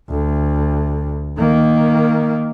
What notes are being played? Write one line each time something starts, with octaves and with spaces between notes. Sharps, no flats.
D2
D#3 A#3